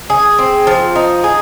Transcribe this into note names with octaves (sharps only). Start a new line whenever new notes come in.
G#4
C4
F3
D#4
G#4